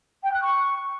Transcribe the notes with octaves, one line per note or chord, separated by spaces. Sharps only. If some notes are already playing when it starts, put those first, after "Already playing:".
G5
F#6
C#6